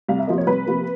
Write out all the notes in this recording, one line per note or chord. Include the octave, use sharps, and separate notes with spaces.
C2 F5
E5
C3 F3 A#3 D#5
C#5
C2 B4
C3 F3 A#3